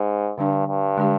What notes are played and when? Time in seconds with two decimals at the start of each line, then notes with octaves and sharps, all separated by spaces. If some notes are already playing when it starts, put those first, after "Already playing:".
Already playing: G#2
0.38 G2 D3 G3 D4
0.68 G2
0.97 D3 G#3 D4 G4